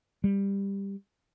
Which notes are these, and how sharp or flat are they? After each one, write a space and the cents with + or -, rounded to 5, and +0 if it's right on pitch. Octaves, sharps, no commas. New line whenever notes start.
G3 +15